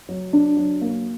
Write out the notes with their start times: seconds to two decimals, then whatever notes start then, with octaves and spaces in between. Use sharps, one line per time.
0.09 F#3
0.33 D4
0.57 F#3
0.81 A#3